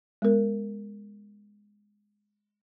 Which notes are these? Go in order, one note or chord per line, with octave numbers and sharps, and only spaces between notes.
G#3 B3 A#4